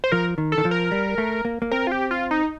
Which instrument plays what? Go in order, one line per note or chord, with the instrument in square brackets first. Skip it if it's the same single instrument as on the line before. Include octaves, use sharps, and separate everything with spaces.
[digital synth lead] C5
[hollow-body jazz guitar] F3 [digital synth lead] A#4
[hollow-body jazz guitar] D#3
[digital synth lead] A4
[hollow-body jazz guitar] D#3
F3
[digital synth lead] A#4
[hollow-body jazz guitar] G3
A3
A#3
A#3
[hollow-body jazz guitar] C4 [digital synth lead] A#4
[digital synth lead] F4
G4
F4
D#4